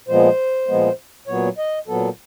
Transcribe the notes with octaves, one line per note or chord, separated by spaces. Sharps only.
A#2 F3 G#3 B3 C5
A#2 F3 G#3 B3
A#2 F#3 B3 C#5
D#5
A#2 F#3 B3 A4